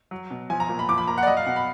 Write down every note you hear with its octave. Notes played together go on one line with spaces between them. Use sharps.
F#3
B2
F3 G#5
A#5
A#2
B5
F3 D6
B5
A#2 A#5
F#5
D5
F#3 D#5
F5
B2 F#5
B5